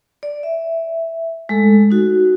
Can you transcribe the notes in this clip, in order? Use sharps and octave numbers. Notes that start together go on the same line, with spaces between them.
D5
E5
G#3 A3 A4
D#4 F#4